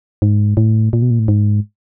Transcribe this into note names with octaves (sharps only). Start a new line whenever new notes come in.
G#2
A2
A#2
B2
A#2
A2
G#2